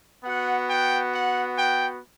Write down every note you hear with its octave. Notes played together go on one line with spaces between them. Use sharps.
B3 F#4 F#5
G5
F#5
G5